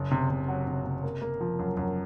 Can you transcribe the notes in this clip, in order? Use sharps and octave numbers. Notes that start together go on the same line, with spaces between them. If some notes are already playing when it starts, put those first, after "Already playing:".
Already playing: F#1
C3
C3
F#3
C3
C3
A#3
A#3
F3
F#2
F#2